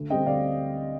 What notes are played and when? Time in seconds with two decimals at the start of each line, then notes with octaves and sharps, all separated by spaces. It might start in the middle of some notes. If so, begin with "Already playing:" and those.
Already playing: D2
0.10 D3 G3 C4 D#5 G5
0.26 D2 D5 F5